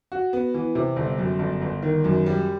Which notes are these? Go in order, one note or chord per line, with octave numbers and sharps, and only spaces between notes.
F#4
B3
E3
C3
G1
F#2
G1
G1
D#3
F#2
G3